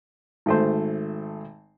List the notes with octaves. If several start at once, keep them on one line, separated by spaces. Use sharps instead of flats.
G#1 A3 C5